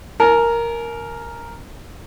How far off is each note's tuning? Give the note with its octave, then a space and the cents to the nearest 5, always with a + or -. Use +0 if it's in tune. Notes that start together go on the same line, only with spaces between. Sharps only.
A#4 +0 G#5 +45